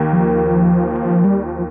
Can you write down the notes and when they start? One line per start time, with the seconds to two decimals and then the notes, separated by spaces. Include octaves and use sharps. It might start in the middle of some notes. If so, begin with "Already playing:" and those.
Already playing: D#2 A#3
0.13 F3
1.24 G3
1.44 F3